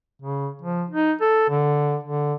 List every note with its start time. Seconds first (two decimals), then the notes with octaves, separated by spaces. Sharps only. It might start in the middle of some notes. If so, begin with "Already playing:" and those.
0.22 C#3
0.62 F3
0.90 D#4
1.21 A4
1.50 D3
2.04 D3